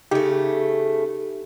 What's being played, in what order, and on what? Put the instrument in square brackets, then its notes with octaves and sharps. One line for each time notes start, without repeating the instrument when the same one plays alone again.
[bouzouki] C#3 A3 [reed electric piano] D#4 G4